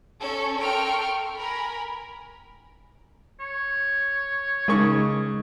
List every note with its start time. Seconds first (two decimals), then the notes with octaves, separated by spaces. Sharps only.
0.20 C#4 A4 C#6
0.58 A4 A#4 G5 C6 C#6 F6
1.36 A#4 G#5 B5
3.40 C#5
4.68 C#3 G#3 D#4 A#4 C#6